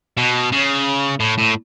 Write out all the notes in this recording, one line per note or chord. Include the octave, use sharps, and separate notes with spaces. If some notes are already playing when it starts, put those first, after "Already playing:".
B2
C#3
A2
A2